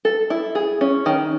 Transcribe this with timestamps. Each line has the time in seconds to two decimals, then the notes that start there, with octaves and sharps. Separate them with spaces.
0.05 A4
0.30 E4
0.55 G#4
0.81 C#4
1.06 D#3